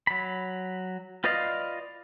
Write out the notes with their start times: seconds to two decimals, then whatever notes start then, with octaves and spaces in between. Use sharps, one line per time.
0.07 F#3 B5
1.24 F4 B4 D5 D#5 F5